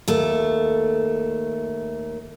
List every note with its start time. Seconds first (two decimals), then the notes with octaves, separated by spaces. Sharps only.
0.08 D#2 A3